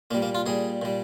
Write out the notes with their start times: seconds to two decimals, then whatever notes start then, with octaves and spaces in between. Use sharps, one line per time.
0.11 A#2 G3 A#3
0.22 A#3
0.35 F4
0.46 A#2 G3 G#4
0.82 A#2 G3